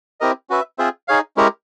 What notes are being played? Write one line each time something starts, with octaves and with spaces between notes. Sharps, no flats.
C4 E4 G4 A#4 D#5
C#4 F#4 B4 E5
C4 F4 G#4 C5 E5
D#4 G#4 C#5 F5
G#3 C#4 E4 G4 A#4